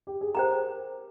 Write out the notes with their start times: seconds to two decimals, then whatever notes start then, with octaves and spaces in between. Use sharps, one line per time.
0.07 G4
0.21 G#4
0.35 G4 A#4 C5 G5 A#5